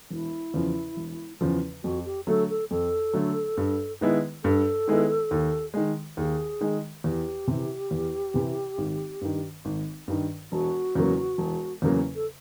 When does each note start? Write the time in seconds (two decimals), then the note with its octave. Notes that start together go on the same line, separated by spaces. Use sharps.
0.10 E1 E4
0.54 E2 C#3 F3
0.97 E1
1.41 E2 C#3 F3
1.83 F2 F#4
2.05 G4
2.27 D3 F#3 A3 A4
2.49 A4
2.71 F2 A4
3.13 D3 F#3 A3
3.57 G2
4.01 D#3 G#3 B3 E4
4.44 G2 A4
4.88 D#3 G#3 B3 E4
5.31 D#2
5.74 D#3 G#3
6.17 D#2 G#4
6.61 D#3 G#3
7.04 E2 G4
7.48 C3 E3
7.91 E2
8.34 C3 E3
8.78 G#1
9.21 G2 D#3
9.65 G#1
10.08 G2 D#3
10.52 E1 F#4
10.95 E2 C#3 F#3 A#3
11.38 E1
11.82 E2 C#3 F#3 A#3
12.15 A4